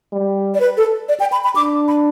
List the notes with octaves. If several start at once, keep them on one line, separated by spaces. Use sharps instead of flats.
G3
D5
B4
A4
D5
G5
B5
B5
D4 D6
B5